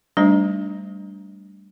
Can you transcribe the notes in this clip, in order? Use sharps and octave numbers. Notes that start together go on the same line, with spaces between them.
G3 A3 D4 D#4 C5 D#5